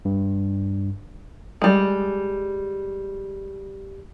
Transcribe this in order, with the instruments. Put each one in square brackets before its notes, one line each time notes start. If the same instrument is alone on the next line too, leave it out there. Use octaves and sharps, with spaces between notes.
[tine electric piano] G2
[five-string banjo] G3 G#3